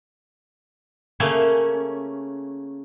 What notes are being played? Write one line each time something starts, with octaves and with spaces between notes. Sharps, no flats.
C#3 A3 A#3 C#4